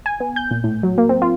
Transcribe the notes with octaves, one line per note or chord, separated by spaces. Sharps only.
G#5
B3
G6
A#2
A2
F#3
A#3
C4
F4